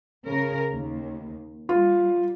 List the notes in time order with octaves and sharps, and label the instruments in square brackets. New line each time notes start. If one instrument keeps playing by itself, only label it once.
[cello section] C#3 A#4
D#2
[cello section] G3 [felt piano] F4